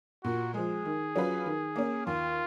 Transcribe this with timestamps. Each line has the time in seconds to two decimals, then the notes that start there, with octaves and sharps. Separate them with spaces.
0.24 A#2 F#4
0.54 F3 G#3 G#4
0.85 D#3
1.16 F#3 C#4 F4 B4
1.46 D#3
1.76 A#3 C#4
2.07 D#2 F4